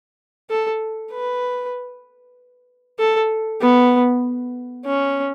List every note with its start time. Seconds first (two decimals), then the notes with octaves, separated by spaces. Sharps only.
0.50 A4
1.12 B4
2.99 A4
3.61 B3
4.85 C#4